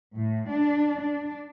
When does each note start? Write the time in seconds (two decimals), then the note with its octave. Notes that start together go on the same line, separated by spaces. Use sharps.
0.16 A2
0.50 D4
1.00 D4